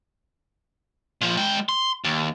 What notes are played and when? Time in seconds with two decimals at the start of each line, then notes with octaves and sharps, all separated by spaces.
1.21 A#2 F3
1.37 G#3 G5
1.69 C6
2.04 D#2